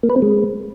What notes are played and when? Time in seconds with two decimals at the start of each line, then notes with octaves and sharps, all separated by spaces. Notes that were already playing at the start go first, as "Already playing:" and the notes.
0.03 A#3
0.10 B4
0.16 C4
0.22 G#3